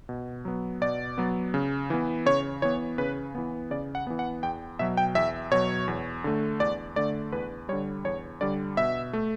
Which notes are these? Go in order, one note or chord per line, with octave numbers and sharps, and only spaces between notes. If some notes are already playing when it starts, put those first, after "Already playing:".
B2
F#3 B3
B2 D5
F#3 B3
C#3
E3 B3
C#3 C#5
E3 B3 C#5
C#3 B4
E3 B3
C#3 D5
F#5
E3 B3
F#5
E2 G5
B2 F#3 E5
G5
E2 E5
B2 F#3 C#5
E2
D3 A3
E2 D5
D3 A3 D5
E2 B4
D3 G3 C#5
E2 C#5
D3 G3 D5
B2 E5
A3